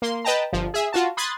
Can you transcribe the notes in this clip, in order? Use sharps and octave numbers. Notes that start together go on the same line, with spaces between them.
A#3 C6
B4 D#5 G5 A5 A#5
G1 F3
G#4 E5
F4 F#4 A5
B5 C6 D#6 F#6 G#6 A6